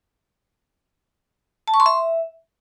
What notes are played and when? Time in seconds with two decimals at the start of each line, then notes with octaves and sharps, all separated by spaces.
1.68 A5
1.74 C#6
1.80 C6
1.86 E5